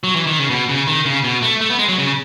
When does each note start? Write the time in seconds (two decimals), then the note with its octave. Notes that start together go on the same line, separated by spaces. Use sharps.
0.04 F#3
0.16 E3
0.27 D#3
0.39 C#3
0.50 B2
0.69 C#3
0.87 D#3
1.05 C#3
1.24 B2
1.42 A3
1.61 A3
1.70 B3
1.79 G#3
1.89 F#3
1.98 C#3